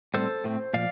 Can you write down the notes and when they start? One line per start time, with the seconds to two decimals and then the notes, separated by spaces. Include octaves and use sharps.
0.14 A2 G3 C4 A4 C5
0.44 A2 A3 C4
0.74 A#2 F3 D5 F5